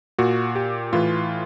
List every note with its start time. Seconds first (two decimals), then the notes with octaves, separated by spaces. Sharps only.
0.19 A#2 F#4
0.56 G4
0.93 A2 E3 F4